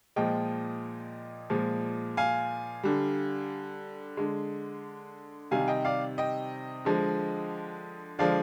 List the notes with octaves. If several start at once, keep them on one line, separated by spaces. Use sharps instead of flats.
A#2 F3 G#3 D#5 G5
A#2 F3 G#3
F5 G#5
D3 G3
D3 G#3
C3 D#3 G3 F5 G#5
D#5 G5
D5 F5
D#5 G5
D3 F3 G#3
D3 F3 G#3 D5 F5